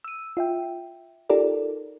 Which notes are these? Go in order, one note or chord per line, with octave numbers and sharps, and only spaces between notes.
E6 D#7
F4 E5 G5
D#4 F4 G4 A4 A#4 D5